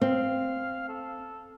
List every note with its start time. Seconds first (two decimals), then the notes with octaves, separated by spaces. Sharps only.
0.01 C4 F5
0.89 A4